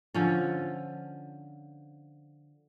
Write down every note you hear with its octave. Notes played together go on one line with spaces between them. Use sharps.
D3 F3 C#4